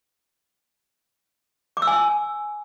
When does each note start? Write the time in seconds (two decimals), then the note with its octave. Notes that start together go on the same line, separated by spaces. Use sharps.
1.77 D6
1.82 E6
1.87 G#5